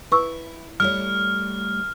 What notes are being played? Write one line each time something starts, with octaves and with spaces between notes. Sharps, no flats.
E4 B4 C#6 E6
G3 A3 C#5 F6